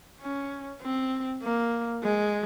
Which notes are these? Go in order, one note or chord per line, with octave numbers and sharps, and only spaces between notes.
C#4
C4
A#3
G#3